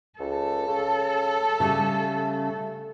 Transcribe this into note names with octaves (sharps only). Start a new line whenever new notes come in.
C#2 A4
C#3
C#3 G3 A3